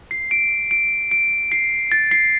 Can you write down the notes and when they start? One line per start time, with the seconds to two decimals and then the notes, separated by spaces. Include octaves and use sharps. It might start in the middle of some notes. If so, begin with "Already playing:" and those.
0.11 C7
0.31 D7
0.71 D7
1.11 D7
1.52 C7
1.92 A6
2.11 C7